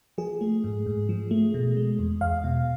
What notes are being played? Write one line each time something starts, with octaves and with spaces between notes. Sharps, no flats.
F3 G#4
A3
G#2
G#2
F3
A3
B2
G#3
E2
E2 F5
B2